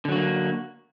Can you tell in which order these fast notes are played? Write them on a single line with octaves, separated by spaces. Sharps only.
D3 F#3 F#4 A#3